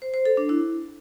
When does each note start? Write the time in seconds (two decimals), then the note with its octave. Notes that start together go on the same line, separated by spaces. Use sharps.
0.02 C5
0.14 C5
0.26 A4
0.37 D4
0.49 E4